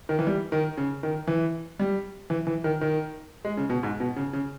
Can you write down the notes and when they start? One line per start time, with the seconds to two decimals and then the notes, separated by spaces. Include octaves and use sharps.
0.09 D#3
0.19 E3
0.27 G3
0.52 D#3
0.77 C#3
1.03 D#3
1.27 E3
1.80 G3
2.30 E3
2.47 E3
2.64 D#3
2.81 D#3
3.45 G#3
3.57 C#3
3.70 B2
3.83 G#2
4.00 B2
4.16 C#3
4.33 C#3